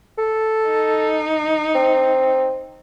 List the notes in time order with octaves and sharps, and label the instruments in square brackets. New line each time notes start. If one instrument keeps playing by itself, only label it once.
[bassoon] A4
[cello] D#4
[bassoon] C4